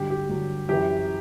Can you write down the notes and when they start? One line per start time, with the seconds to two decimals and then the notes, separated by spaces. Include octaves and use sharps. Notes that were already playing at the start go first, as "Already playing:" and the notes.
Already playing: G2 D3 F#3 G4
0.10 G4
0.29 G2 D3 F#3
0.69 F#2 E3 G4